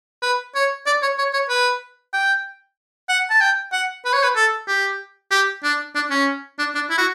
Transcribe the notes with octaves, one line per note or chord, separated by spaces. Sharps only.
B4
C#5
D5
C#5
C#5
C#5
B4
G5
F#5
A5
G5
F#5
B4
C#5
B4
A4
G4
G4
D4
D4
C#4
D4
D4
E4
F#4